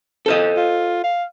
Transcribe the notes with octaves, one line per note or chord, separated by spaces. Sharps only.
A4 C5 D#5
F4
F5